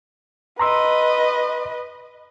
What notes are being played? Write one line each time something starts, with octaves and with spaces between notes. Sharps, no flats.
B4 D#5 A#5 C6 E6